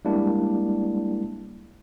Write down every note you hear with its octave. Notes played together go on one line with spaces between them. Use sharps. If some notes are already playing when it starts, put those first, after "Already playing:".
G3 G#3 A#3 D4 E4 G4